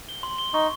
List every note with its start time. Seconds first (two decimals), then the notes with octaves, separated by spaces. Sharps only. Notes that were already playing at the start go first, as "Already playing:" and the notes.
0.09 G7
0.23 C6
0.38 G7
0.54 D#4 C#6